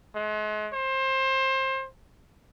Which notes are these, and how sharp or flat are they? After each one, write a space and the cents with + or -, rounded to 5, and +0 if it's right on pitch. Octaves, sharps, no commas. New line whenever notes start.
G#3 +40
C5 +25